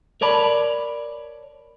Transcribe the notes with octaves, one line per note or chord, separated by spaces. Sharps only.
A#4 C#5 D5 A5 B5